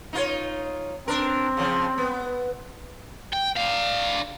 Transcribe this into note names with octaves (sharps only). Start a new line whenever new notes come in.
D#4 F4 C#5
C4 D4 A#4
C#3 F3
B3
G5
D4 F5